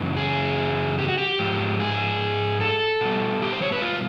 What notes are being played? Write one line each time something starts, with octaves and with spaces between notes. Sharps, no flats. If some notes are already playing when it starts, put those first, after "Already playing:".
Already playing: F#2 C#3 E3
G#4
G4
F#4
G4
G#2 F3 G#3
G#4
A4
B2 G3
G4
C5
C#5
B4
F4